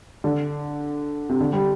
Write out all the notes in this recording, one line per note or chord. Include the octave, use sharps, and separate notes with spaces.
D3
C3
D3
G3